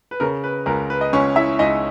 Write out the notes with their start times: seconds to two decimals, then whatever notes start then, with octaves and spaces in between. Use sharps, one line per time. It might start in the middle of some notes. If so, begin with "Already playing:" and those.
0.11 B4
0.20 C#3 A#4
0.44 B4
0.66 C#2 A#4
0.90 B4
1.01 D#5
1.13 C#2 C#4 C#5
1.36 E4 E5
1.59 C#2 D#4 D#5